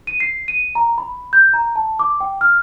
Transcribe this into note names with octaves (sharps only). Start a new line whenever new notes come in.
D#7
C7
D#7
A#5
B5
G6
A#5
A5
D6
G5
F6